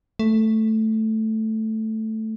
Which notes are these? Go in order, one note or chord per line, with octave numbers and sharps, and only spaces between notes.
A3